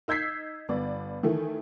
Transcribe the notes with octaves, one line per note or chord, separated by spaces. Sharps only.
D#4 E6 G6 G#6 B6 C7
G1 B3 D5
D#3 E3 A3